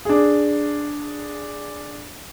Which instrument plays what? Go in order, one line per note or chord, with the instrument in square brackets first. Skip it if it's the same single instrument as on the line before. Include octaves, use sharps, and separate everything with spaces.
[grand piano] D4 G#4